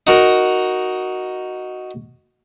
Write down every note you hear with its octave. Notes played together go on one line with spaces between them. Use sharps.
D#4 F#4 A#4